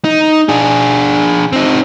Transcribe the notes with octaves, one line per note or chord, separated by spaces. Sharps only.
D#4
D4 G#4
C4 D#4